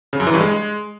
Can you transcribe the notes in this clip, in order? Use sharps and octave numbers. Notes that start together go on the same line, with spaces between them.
C#3
F#2
E3
G2
G#3